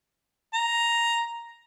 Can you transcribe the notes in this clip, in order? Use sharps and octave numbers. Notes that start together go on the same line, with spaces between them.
A#5